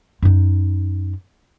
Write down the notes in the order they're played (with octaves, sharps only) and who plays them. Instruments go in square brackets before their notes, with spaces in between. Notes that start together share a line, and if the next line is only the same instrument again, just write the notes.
[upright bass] F#2 D#4